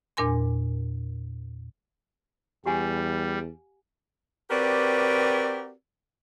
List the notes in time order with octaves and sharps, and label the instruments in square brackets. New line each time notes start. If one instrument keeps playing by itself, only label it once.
[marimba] E2 A#2 D4 A#4 G#5 C6
[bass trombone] E2 [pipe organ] G3 [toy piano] G4 F#5 G#5
[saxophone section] C4 F#4 G4 A#4 B4 D5